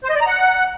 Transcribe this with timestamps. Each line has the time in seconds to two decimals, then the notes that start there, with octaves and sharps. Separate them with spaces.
0.04 C5
0.09 D#5
0.15 D5
0.21 A#5
0.27 F#5